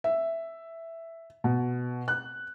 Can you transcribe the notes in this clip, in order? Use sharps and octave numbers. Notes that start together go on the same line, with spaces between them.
E5
B2
F#6